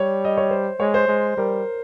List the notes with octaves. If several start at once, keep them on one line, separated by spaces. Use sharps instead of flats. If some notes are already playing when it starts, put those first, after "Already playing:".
Already playing: G3 C#5
D#5
C#5
C5
G#3 C#5
C5
G#3
G3 A#4